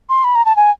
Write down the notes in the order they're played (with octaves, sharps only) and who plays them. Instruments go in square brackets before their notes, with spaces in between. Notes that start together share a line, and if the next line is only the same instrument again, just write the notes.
[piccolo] C6
B5
A#5
A5
G#5